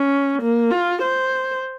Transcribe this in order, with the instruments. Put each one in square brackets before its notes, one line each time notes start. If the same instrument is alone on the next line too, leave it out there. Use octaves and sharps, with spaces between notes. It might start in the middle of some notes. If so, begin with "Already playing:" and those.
Already playing: [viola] C#4
A#3
F4
C5